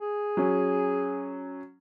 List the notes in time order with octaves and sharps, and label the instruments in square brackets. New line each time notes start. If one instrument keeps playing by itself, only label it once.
[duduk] G#4
[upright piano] F#3 C#4